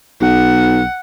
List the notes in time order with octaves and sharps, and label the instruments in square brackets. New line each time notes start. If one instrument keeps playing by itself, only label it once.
[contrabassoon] B1 [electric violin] F#5